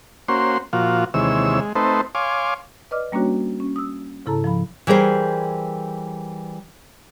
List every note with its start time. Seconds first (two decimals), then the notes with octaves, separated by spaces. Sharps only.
0.28 A#3 C#4 F#4 C5 C6
0.73 A#2 F3 F4 F#4
1.14 D#2 C3 E3 G#3 C#5 E6
1.60 G#3
1.75 A3 C4 D#4 A4 B4 C5
2.15 C#5 F5 G#5 C6 D6
2.91 B4 D5 D#5 D6 F6
3.12 G3 A#3 C#4 D4 F#4 C#5
3.60 C#4
3.76 D#6 E6
4.26 G#2 C#3 E4 A4 A5 A#5
4.44 F3 F5 B5
4.87 E3 G3 G#4 A#4 C5